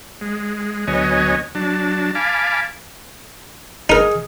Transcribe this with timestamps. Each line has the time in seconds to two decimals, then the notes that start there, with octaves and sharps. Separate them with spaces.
0.21 G#3
0.87 D2 F#3 B3 C#5 D#5 G#5
1.55 F#3 D4 A5
2.15 F5 G#5 A5 B5 D6
3.90 D#4 G#4 A#4